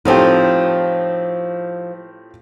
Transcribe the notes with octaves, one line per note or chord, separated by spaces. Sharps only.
A2 F3 C4 D#4 F4 G4